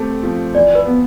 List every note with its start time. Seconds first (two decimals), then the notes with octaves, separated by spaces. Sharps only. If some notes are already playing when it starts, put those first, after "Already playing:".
Already playing: A3 C4 G4
0.23 F3
0.55 E3 D5
0.75 B4
0.85 B3